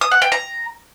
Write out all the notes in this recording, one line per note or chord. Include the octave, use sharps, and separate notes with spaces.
D#6
F#5
G5
A#5